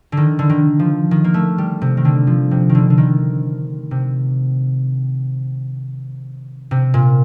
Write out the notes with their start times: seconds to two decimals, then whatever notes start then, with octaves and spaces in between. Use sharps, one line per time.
0.12 D3
0.17 D#3
0.39 D3
0.50 D#3
0.79 F3
1.11 D#3
1.24 A#3
1.34 A3
1.58 G3
1.81 C3
1.97 D#3
2.05 D3
2.27 F3
2.51 C3
2.69 D#3
2.75 D3
2.90 D3
2.98 D#3
3.91 C3
6.71 C3
6.94 A#2